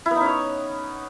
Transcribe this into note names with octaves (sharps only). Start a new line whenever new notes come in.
E4
B3
D#4
C#4
C#5